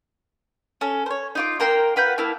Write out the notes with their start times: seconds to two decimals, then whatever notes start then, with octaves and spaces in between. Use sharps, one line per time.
0.81 C#4 A4
1.06 C5 C#5
1.35 D#4 F4 D6
1.60 A#3 A#4 G5 C6
1.96 F4 B4 F#5 G6
2.18 A#3 E4 A5 F6